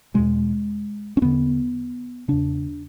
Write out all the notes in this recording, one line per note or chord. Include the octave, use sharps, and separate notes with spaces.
E2 B2 G#3
C#4
E2 D3 B3
E2 C#3 D4